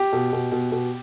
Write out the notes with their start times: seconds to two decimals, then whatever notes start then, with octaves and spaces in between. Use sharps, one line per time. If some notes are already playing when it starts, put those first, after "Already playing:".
Already playing: G4
0.13 B2
0.33 B2
0.52 B2
0.72 B2